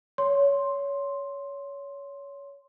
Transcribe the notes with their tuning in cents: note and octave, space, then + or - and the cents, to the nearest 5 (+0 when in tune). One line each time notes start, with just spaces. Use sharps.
C#5 +20 C6 +5